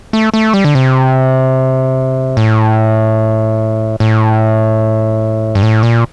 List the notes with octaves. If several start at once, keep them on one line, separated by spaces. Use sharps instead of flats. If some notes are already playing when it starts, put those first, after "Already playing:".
A3
A3
G3
D3
C3
A2
A2
G2
A2
A#2